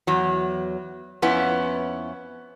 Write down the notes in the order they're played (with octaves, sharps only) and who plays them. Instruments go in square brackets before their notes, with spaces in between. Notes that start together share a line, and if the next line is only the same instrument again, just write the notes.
[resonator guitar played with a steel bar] E2 F#3
F2 B3 C#4 E4